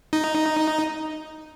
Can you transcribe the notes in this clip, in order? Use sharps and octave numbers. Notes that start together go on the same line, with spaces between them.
D#4